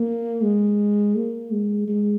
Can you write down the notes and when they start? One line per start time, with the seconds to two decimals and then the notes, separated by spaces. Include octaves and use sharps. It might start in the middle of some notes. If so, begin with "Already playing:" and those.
Already playing: A#3
0.42 G#3
1.16 A#3
1.52 G#3
1.88 G#3